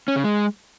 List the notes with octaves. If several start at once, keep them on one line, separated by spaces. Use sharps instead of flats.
C#4
C#3
G#3